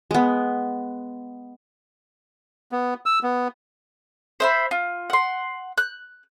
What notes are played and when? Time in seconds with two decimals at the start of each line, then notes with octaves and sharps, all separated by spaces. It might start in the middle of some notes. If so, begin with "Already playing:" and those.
0.11 G#3 B3
2.72 B3
3.06 E6
3.23 B3
4.40 C5 E5 B5
4.71 F4
5.10 F#5 C6
5.78 F#6